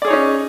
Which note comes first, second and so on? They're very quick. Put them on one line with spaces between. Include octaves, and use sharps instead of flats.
D5 G#4 C#5 D#4 C#4